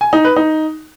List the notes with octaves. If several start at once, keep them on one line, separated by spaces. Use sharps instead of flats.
G#5
D#4
B4
D#4